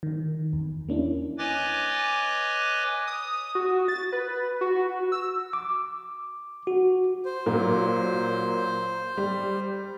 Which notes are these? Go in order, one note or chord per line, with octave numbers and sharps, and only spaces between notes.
D#3
E2
A#3 C#4 D4 E4
B4 C#5 D#5 G#5 D6 A6
D#6
F#4
A6
B4
F#4
E6
D6
F#4
C5
A#2 F#3 A#4
G3